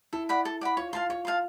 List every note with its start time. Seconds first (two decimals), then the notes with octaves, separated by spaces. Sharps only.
0.13 E4 A4
0.29 D5 F#5 B5
0.45 A4
0.61 D5 F#5 B5
0.77 F4 C#5
0.93 F4 F5 A5 C6
1.09 F4 C#5
1.25 F5 A5 C6